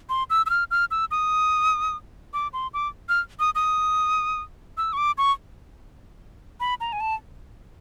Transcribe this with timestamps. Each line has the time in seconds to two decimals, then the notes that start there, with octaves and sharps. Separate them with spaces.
0.09 C6
0.30 E6
0.46 E6
0.50 F6
0.71 F6
0.91 E6
1.11 D#6
2.34 D6
2.53 C6
2.74 D6
3.09 F6
3.40 D#6
3.55 D#6
4.77 E6
4.93 C#6
4.97 D6
5.18 C#6
6.60 B5
6.80 A#5
6.93 G#5
7.00 A5